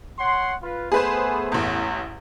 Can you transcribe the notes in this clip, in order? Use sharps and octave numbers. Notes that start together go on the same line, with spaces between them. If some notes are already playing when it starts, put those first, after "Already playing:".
C#5 F#5 C6
F4 B4
A3 B3 G#4 B4 C5
A1 E2